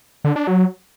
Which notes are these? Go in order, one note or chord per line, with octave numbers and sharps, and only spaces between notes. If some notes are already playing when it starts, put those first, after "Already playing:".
D3
D4
F#3